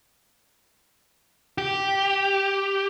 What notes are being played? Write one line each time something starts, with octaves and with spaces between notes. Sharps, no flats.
G4